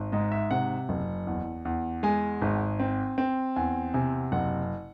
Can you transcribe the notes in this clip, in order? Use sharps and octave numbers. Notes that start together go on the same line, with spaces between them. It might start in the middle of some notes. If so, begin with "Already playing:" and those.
Already playing: G#1
G#2 D#5
E5
C3 F#5
F#1
E2
E2
G#3 G#5
G#1
C4
C4
E2 G#5
C3 G#5
F#1 F#5